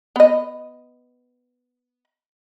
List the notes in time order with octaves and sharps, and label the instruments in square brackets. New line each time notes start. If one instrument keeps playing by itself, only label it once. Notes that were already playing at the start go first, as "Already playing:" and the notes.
[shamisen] B3 D#5